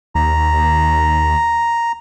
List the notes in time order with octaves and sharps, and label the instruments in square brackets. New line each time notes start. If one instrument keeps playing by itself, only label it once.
[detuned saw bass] D#2 [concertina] A#5